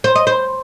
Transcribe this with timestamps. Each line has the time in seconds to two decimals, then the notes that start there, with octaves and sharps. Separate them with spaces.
0.04 C5
0.15 D#5
0.27 C5